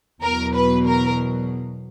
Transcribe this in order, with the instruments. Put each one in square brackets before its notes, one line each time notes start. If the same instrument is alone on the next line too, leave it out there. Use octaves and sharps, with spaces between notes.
[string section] E2 B2 F#3 A#4
B4
A#4